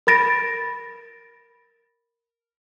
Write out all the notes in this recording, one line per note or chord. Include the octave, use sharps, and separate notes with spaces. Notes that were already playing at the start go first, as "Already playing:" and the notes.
A#4 B5 A6 A#6 D7